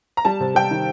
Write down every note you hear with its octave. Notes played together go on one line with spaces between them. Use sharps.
A#5
G3 A5
C3
G3 G5
D#3